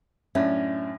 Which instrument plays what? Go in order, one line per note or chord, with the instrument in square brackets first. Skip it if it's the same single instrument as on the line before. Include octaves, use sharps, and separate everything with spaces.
[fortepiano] F#2 A2 D4 [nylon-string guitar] C#4 [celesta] E5